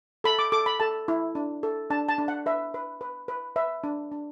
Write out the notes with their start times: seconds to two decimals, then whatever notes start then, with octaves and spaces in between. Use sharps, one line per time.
0.24 A4 B5
0.39 D6
0.52 A4 D6
0.66 B5
0.80 A4 A5
1.08 E4
1.35 D4
1.63 A4
1.90 D4 A5
2.09 A5
2.18 D4
2.28 F#5
2.46 B4 E5
2.74 B4
3.01 B4
3.28 B4
3.56 B4 E5
3.84 D4
4.12 D4